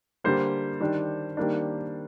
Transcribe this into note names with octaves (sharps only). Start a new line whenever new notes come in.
D3 G3 A#3 C5
D#3 G3 D4
D#3 G3 A#3 D4